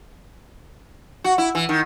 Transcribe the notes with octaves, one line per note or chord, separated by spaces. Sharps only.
F#4
E4
E3
D#3